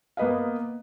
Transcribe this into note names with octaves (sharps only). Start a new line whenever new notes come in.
A#3 B3 B4 D#5 F5